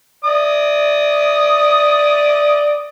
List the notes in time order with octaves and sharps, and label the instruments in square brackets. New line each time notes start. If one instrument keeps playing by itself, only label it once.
[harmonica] D5 D#6